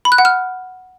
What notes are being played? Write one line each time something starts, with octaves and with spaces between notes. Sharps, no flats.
B5
F#6
F#5
F6